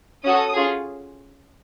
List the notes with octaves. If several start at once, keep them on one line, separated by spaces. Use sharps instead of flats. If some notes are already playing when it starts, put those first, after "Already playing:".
C#4 F#4 A4 D#6
C#4 F4 G#4